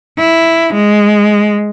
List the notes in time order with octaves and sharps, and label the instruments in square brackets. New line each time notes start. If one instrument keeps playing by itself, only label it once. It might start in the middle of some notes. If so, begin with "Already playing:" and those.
[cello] E4
G#3